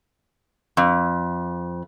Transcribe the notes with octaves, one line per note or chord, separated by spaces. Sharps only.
F2